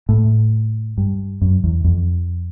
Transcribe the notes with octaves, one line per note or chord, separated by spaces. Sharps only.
A2
G2
F#2
E2
F2